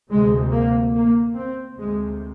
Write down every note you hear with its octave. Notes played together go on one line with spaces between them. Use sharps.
D2 C3 G#3
A#3
A#3
C4
D2 C3 G#3